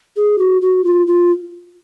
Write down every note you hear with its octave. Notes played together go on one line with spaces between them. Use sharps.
G#4
F#4
F#4
F4
F4